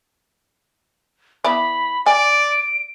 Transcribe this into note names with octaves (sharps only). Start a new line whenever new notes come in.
B3 E4 D5 B5
D5 G#5 D7